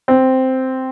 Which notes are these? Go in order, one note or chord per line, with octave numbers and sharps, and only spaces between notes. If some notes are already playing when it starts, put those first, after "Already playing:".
C4